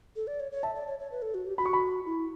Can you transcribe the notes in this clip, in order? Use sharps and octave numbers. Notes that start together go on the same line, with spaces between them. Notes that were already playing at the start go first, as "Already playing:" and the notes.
A4
D5
C#5
C#5
E5 A5
D5
C#5
C#5
B4
A4
F#4
G4
F#4 B5
C#6
B5
E4